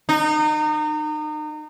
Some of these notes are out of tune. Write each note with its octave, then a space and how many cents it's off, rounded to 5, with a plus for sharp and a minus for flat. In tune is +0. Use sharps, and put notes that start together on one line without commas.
D#4 -30